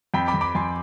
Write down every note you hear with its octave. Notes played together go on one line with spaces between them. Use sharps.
F2 G5 B5
B5 D6
F2
B5 D6
F2 G#5 C6